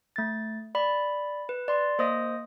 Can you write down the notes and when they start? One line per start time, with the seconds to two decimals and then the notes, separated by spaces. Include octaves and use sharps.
0.16 A3 A6
0.75 D5 B5
1.49 B4
1.68 D5 C6
1.99 A#3 C5 D#5 D#6 A#6